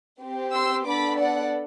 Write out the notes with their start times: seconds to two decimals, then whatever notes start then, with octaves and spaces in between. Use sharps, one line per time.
0.21 C4 G4
0.53 C6 E6
0.86 B3 D4 A4 B5 D6
1.19 D5 F#5